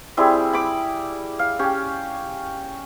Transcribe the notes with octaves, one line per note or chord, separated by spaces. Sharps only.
G3 C4 E4 G#4
B5 D6
F5
C#4 G4